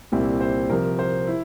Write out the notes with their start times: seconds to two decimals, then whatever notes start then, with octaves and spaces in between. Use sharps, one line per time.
0.12 C2 A#2 G3 C4 E4
0.41 C5
0.70 C2 C3 F3 A#4
0.99 C5
1.27 E4